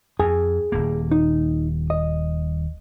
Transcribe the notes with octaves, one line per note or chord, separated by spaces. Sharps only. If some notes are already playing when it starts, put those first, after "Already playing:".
F2 G#4 G#5
D#1 A#3
D#4
D#5